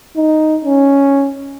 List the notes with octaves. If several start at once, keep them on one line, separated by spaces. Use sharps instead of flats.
D#4
C#4